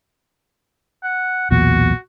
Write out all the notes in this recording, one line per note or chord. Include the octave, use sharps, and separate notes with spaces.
F#5
B1 E2 A#2 F#4